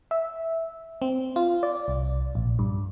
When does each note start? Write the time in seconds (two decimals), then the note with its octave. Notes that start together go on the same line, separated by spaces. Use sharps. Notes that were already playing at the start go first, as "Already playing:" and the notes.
0.11 E5
1.02 C4
1.36 F4
1.63 D5
1.88 C2
2.35 A#1
2.59 G2